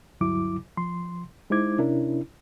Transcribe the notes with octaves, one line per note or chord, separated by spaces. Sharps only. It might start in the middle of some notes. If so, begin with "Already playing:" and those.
D2 G2 F#3 E4 D6
F3 C6
G#3 D#4 E4 C5 D6 G#6
C3 C#4 D4 E4 A#4